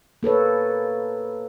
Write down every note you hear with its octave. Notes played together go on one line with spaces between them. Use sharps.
A#3 A4 B4 C#5